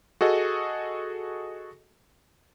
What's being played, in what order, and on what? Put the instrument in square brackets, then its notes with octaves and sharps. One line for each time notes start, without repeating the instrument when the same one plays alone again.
[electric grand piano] F#4 G#4 A4 D#5